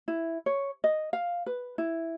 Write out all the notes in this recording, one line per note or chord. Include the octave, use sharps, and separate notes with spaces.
E4
C#5
D#5
F5
B4
E4